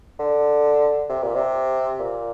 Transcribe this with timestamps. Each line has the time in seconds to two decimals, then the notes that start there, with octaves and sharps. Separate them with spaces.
0.19 D3
1.09 C3
1.23 A#2
1.35 C3
1.99 A#2